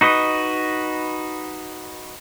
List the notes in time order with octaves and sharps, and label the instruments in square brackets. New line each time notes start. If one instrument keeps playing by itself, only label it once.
[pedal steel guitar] D#4 F#4 B4 D#5